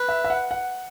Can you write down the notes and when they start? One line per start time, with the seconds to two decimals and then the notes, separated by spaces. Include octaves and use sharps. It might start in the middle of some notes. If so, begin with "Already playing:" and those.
Already playing: B4
0.09 E5
0.24 E5
0.30 F#5
0.51 F#5